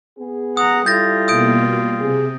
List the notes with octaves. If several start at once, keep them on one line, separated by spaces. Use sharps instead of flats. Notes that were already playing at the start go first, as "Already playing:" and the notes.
B3 G#4
F#5 A#5 D#6
G3 E4 F4 A4 G6 A6 A#6
B2 A#3 D#6 G6 D7
C3 G#4